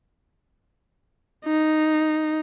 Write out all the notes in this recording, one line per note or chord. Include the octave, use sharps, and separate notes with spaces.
D#4